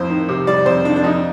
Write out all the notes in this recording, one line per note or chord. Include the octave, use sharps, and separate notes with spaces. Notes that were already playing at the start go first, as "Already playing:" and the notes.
Already playing: F2 A2 C5
D#3
C3
G3 D5
F2 C5
D#3 D4
D4
F2 D#4